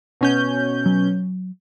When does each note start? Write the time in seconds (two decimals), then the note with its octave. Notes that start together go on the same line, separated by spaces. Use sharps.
0.21 B2 C#4 G6
0.86 F#3